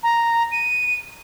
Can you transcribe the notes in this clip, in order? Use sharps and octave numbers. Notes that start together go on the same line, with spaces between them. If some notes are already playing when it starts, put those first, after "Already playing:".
A#5
D#7